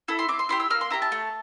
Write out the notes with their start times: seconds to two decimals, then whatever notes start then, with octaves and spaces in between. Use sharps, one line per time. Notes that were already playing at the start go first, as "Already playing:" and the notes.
0.08 E4 A4
0.19 C6
0.29 C4 D6
0.39 C6
0.49 E4 G4 C6
0.60 E6
0.71 A#3 F6
0.81 C6
0.90 E4 G4 A#5
1.02 A5
1.12 A3